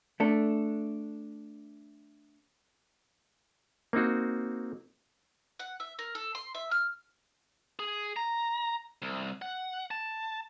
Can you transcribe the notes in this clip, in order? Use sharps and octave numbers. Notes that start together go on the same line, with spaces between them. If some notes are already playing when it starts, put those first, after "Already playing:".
A3 D4 A4
A#3 C4 D#4 F#4
F#5
E5
A#4
A4
C6
E5
F6
G#4
A#5
C2
F#5
A5